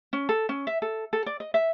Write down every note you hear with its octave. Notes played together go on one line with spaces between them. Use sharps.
C#4
A4
C#4
E5
A4
A4
D5
D#5
E5